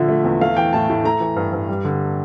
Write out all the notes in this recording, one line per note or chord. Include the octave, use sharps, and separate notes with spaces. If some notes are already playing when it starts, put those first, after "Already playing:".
Already playing: A#2 D3 F3 E5
A3
E2
A3 F5
E3 G5
A2 A5
A2
A3 A#5
E3
G2
G2
G3
D3